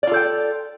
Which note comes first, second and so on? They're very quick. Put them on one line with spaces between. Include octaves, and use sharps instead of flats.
D5 F4 A4 G5